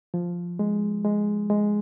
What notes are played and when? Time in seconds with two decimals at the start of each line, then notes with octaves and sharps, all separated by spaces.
0.14 F3
0.59 G#3
1.05 G#3
1.50 G#3